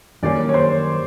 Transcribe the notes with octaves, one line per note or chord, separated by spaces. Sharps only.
F#2 D#3 G3 A#3 C#4 D5
C#5
C5